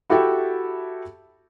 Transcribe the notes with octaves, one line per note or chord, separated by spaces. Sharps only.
E4 F#4 G4 A4 E5 G5